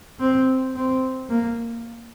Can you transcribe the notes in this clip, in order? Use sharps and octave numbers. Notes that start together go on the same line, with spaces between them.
C4
C4
A#3